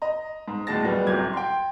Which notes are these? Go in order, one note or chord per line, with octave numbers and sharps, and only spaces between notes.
D#5 A#5
G#2
D2 A2 G#3 A5 A6 A#6
F#2 A#2 G3 G#3 B3
D1 C2 C3 F#3 G6 G#6
G5 C6